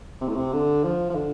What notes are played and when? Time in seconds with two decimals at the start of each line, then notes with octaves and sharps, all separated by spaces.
0.21 C3
0.28 A2
0.36 C3
0.53 D3
0.84 F3
1.10 F3
1.15 D3